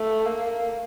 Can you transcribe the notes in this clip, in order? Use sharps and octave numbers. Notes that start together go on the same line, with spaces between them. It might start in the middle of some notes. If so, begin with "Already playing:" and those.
Already playing: A3
A#3